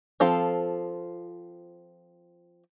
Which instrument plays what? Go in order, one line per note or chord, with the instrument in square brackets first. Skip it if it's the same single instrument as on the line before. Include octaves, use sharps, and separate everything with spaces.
[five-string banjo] F3 C4 F4 A4